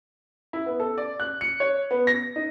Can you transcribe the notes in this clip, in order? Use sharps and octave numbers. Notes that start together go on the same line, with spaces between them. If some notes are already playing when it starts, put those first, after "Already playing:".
E4
B3
A4
D5
F#6
C#7
C#5
B3
A#6
D#4